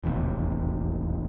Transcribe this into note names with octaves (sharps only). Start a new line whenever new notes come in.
E1 A1 D#2 C3